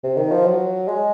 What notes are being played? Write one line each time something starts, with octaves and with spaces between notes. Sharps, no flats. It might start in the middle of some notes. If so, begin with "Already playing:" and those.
C3
D#3
F3
F#3
G#3